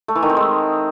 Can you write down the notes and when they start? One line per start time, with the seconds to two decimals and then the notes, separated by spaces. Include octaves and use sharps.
0.08 A3
0.15 E3
0.23 D#3
0.30 C4
0.37 G#3